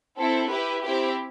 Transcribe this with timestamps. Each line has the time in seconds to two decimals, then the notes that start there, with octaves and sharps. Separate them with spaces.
0.19 C4 E4 A4
0.51 E4 G4 B4
0.84 C4 E4 G4